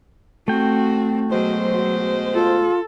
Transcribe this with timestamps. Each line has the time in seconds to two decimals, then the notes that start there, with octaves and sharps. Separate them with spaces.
0.48 A3 C4 F#4 G5
1.30 B2 F#3 G#3 C5
2.34 F4 A4